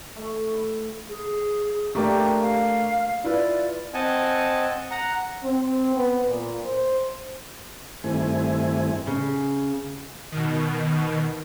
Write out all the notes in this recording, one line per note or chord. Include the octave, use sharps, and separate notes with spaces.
A3
E4
G#4
A3 A#3 D4 G4
F5
E4 F4 B4 D5
C4 D#5 F#5 G#5 A5
F#5 A#5
C4
B3
A#2
C5
G2 D#3 A3 C4 E4 G#5
C#3
B2 D#3